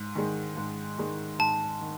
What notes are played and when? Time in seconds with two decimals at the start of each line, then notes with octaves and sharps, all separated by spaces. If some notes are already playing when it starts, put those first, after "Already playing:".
Already playing: G#2
0.15 D#3 G#3
0.57 G#2
0.98 D#3 G#3
1.39 G#2 A5
1.81 D#3